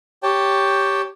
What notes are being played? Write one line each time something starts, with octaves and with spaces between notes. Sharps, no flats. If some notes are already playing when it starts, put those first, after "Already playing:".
G4 C#5 G5 A5